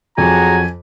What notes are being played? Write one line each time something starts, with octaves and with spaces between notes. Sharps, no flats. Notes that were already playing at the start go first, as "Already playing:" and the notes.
F2 F#3 F#4 G#4 G#5 A#5